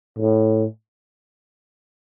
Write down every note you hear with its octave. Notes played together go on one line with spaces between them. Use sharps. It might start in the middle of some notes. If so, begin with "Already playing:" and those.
A2